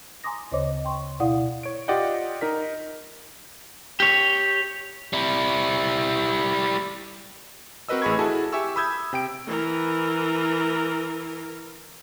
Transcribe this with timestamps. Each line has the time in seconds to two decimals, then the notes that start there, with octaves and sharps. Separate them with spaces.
0.24 G#5 A#5 C6 D6 D#6 A#6
0.52 D2 C#3 C5 C#5 D#5 D6
0.85 G5 C6 C#6
1.20 B2 E4 D5 F5 F#5 D#6
1.63 C#5 D7
1.88 F4 G4 D5 D#5 F#5 G5
2.41 D#4 A#4 B6
4.00 G4 C#5
5.13 G3 E4
7.89 C4 F#4 A#4 B4 D#5 E6
8.02 A1 G#4 B5 C#6 G#6
8.19 E4 F#4 G#4 A4 G#5 A5
8.52 G4 E5 G#5 C#6 E6
8.76 B5 D#6 E6 G6 G#6
9.13 C3 G5 D7
9.48 E3 A#4